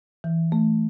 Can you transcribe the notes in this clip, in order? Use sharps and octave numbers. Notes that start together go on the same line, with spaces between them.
E3
A3